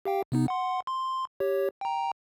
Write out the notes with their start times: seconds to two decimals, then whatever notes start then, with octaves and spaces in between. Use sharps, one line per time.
0.05 G4 F5 G5
0.32 C3 B3 D#4
0.48 F#5 C6
0.87 C6
1.40 G4 C#5
1.81 G5 A#5